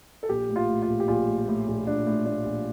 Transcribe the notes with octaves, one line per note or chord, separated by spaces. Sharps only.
A4
A#1 G4
A2
F4
A2
F4
A#1
G4
A#1 F4
A2
A2
A#1
A#1 D4
A2
A2 D4
A#1